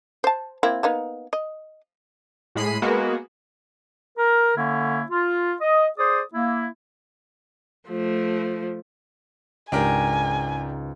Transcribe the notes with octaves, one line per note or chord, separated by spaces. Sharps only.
C5 A5
A#3 C4 E4
A#3 B3 D#4
D#5
A2 G#3 B5 C7 D#7
G#3 A#3 B3 F#4
A#4
D3 A#3 C#4 E4
F4
D#5
G#4 C5 D5 D#6
A#3 E4
F3 A3
C#2 G#2 D4 G4 A#4 G#5